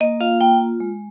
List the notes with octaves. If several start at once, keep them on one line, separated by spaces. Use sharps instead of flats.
A#3 D#5
F4 F5
A#3 G5
F4
G#3